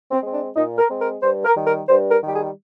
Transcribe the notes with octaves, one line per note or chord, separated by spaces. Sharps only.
C4
G#3 C4
D4
A#2 D#4
A#4
G#3 C4
A#4
G2 C5
A#4
D#3 G3
A#4
G2 C5
A#4
D#3 G3 G4
G#4